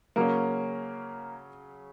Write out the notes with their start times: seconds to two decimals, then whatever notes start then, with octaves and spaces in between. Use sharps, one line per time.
0.16 C#3 F#3 A#3 C#4